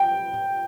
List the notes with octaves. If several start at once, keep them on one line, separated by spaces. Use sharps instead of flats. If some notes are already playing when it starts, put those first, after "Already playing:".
Already playing: G5